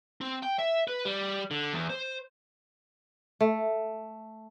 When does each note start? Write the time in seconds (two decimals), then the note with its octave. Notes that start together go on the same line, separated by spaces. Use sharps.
0.21 C4
0.43 G5
0.59 E5
0.88 B4
1.05 G3
1.51 D3
1.73 E2
1.90 C5
3.41 A3